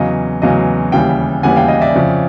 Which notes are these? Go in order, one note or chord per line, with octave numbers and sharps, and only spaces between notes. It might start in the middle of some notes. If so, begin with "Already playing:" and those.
Already playing: E2 C#3 F#3 D#5 F5
E2 C#3 F#3 D#5 F5
D#2 C#3 E3 G3 F5 G5
D#2 C#3 E3 G3 F#5 G#5
F5 G5
D#5 F5
D5 E5
F2 C#3 F3